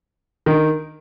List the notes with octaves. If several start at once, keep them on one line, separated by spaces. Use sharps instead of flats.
D#3